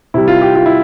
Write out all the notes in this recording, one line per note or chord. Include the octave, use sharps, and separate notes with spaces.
C3 G3 E4
F4
G4
F4
E4